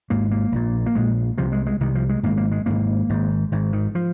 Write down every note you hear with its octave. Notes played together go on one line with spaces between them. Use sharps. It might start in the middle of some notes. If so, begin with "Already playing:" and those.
G#1 G#2 A#3
A#3
A#1 A#2
A#3
A#1 A#2 G#3
C2 C3 F3
G#3
G#3
C2 C3 D#3
F3
G#3
G#1 G#2 A#3
A#3
G#3
G#1 G#2 A#3
G#1 G#2
G#1 G#2
D#3
F3